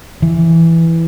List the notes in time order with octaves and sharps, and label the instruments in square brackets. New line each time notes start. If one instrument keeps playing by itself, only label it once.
[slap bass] E3